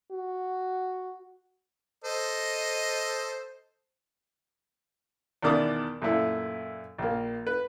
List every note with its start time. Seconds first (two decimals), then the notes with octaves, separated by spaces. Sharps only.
0.11 F#4
2.04 A4 C5 D#5
5.42 E2 B2 D#3 D5 D6 D#6
6.02 F#2 A#2 A3 E4
6.98 A#1 A#3
7.47 B4